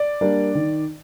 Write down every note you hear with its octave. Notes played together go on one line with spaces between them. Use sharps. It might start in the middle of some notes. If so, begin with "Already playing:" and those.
Already playing: D5
G3 A#3 D4
D#3